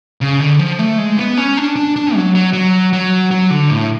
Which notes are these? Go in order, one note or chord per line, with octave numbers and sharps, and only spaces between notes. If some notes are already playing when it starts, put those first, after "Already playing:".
C#3
D3
F3
A3
G#3
B3
C#4
D4
D4
D4
F#3
F#3
F#3
F#3
F#3
D3
A2